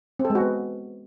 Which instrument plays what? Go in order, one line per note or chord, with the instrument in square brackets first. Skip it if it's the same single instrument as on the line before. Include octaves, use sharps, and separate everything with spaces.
[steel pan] C4
A4
G#3
F#4
B3